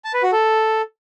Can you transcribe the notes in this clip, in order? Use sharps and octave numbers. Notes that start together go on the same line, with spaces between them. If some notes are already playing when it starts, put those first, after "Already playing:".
A5
B4
F#4
A4